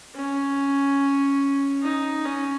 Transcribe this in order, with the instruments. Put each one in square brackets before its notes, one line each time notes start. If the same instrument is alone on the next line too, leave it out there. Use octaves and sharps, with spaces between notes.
[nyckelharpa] C#4
D#4
C#4